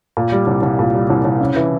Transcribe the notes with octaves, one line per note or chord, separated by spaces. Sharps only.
A#2
G3
C2
C2
A#2
G3
C2
C2
C#3
E3